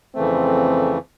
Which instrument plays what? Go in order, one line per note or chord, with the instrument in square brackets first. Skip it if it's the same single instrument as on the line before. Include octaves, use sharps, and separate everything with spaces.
[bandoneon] F2 C#3 E3 A3 [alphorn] C4